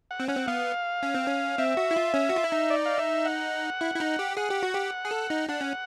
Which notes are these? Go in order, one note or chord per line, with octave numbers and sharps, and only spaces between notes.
F#5
C4
C#4 F#5
C4
B3 F5
C#4
C4
C#4
C4 E5
F#4
E4
F4
C#4
F#4
F4
E4
D#4
D5
F5
E5
F#5
E4
E4
D#4
G4
G#4 F#5
G4
F#4
G4
G#4
A4
D#4
D4 F#5
C#4